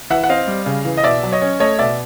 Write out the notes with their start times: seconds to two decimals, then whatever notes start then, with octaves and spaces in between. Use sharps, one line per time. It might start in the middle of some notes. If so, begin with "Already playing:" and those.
0.10 E3 E5 F#5
0.24 F#5
0.29 C4 D#5 F5
0.47 G3
0.66 C#3
0.85 E3
0.97 D#5
1.04 B2 D5 E5
1.23 F#3
1.32 C#5 D#5
1.42 C#4
1.60 A3 C#5 D#5
1.79 B2 D5 E5